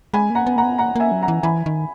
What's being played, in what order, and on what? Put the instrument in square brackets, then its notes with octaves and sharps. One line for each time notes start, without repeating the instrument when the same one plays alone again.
[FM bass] G#3 [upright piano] G#5 B5
[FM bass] A#3 [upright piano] F#5 A#5
[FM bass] B3
[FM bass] A#3 [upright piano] F#5 A#5
[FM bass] B3
[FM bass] A#3 [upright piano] F#5 A#5
[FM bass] A#3 [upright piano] E5 G#5
[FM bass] F#3
[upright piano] F#5 A#5
[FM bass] E3
[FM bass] E3 [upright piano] G#5 B5
[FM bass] D#3